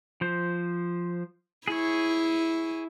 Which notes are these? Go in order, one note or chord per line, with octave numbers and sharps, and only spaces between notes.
F3 C5
E4 G#4 C#5